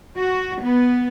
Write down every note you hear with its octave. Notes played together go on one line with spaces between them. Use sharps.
F#4
B3